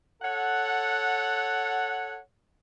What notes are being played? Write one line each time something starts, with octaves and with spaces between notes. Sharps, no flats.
A4 C#5 F#5